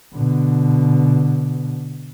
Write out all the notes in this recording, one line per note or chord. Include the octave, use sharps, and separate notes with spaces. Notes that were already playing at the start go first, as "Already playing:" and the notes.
B2 D3